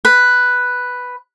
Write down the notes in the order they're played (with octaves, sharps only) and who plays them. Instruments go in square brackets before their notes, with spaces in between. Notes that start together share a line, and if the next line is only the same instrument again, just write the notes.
[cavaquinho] B4